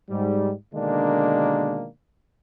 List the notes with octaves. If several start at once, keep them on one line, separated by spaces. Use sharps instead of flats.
G#2 G3
B2 D3 D#3 G#3 A#3 D4